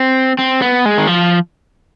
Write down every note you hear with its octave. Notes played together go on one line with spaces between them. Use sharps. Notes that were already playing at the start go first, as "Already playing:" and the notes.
Already playing: C4
C4
B3
G#3
D#3
F3